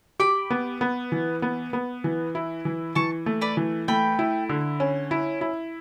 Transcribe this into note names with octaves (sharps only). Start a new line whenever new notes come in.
G4 B5 D6
B3
B3
E3
B3
B3
E3
E4
E3
E3 A5 C#6
A3
B4 D5
E3
A3 G5 B5
E4
D3
C#4
E4
E4